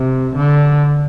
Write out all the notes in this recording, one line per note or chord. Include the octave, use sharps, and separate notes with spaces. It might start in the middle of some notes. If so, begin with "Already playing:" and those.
Already playing: C3
D3